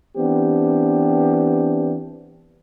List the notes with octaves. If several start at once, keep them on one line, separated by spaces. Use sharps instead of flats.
E3 B3 C4 D4 G4